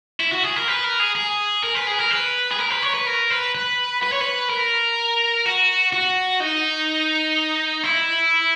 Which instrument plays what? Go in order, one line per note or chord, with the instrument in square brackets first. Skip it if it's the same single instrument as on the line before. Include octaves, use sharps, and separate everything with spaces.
[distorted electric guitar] E4
F#4
G#4
A#4
B4
A#4
G#4
G#4
A#4
B4
G#4
A#4
B4
G#4
A#4
B4
C#5
B4
A#4
B4
B4
B4
C#5
B4
A#4
F#4
F#4
D#4
E4